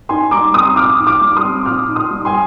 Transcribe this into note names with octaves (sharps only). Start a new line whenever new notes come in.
D#4 G#5 C6
G3 A#5 D6
C4 C6 D#6
A#2 D6 F6
D#4
D6 F6
G3
C6 D#6
C4
A#2 D6 F6
D#4
C6 D#6
G3
G#5 C6